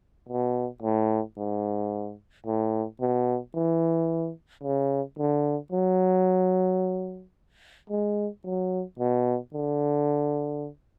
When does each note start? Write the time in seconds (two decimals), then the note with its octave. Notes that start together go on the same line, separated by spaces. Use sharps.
0.29 B2
0.83 A2
1.37 G#2
2.46 A2
3.01 B2
3.55 E3
4.64 C#3
5.19 D3
5.72 F#3
7.90 G#3
8.45 F#3
8.99 B2
9.53 D3